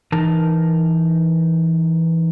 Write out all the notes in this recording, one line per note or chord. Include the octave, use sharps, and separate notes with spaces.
E3 D#4 A#4 A5